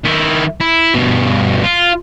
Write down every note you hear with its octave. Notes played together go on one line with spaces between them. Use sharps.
D#3 E4
E4
G2 B2
F4